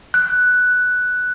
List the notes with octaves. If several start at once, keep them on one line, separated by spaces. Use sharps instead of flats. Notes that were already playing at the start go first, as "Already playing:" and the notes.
F#6